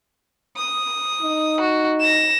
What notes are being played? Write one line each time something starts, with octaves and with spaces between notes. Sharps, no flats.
D#6
D#4
F#4
A#6 E7